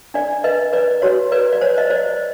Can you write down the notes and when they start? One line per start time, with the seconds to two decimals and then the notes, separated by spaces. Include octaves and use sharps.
0.14 D4 D5
0.44 B4 D#5
0.73 B4 D5
1.02 F#4 C#5
1.32 B4 D5
1.53 D5
1.61 C5 C#5
1.78 D#5
1.90 C5 D5